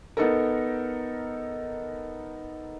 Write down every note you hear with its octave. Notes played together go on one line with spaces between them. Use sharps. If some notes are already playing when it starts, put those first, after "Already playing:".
B3 D#4 A4 A#4